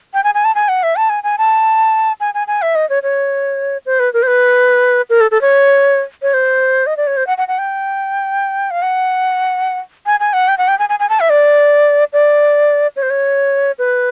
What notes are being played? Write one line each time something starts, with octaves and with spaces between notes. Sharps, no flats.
G5
G#5
G#5
A5
G#5
F#5
E5
A5
G#5
G#5
A5
G#5
G#5
G#5
E5
D#5
C#5
C#5
C5
B4
A#4
C5
B4
A#4
A4
A4
C#5
C#5
C5
D#5
D5
C#5
C5
F#5
F#5
F#5
G5
F5
F#5
G#5
G#5
F#5
G5
F#5
G5
G#5
G#5
G#5
A5
E5
D5
D5
C#5
C5
C#5
B4